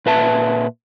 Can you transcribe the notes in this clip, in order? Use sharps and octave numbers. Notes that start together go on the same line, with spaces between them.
A#2 B4 E5 A5